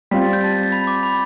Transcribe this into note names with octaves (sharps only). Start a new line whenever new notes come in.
G3 C4 F4 B6
A6
G6
A5 A6
A6
B5 B6
D6
B5